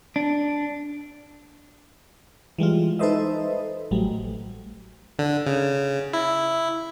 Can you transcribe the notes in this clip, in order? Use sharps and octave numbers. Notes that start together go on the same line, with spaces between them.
D4
E3 G3 G#3 F4
D#4 A4 B4 C5 D#5 E5
A1 F#3 G3 A3
D3
C#3
E4